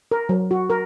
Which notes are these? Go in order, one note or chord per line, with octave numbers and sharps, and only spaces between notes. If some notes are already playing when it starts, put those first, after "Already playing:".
A#4
F#3
F#4
A#4